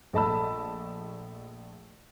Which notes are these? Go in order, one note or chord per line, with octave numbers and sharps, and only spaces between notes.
A#1 A3 D#5 A5 B5 E6